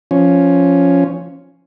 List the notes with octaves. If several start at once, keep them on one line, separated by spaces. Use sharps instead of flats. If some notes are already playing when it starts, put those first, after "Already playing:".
F3 C#4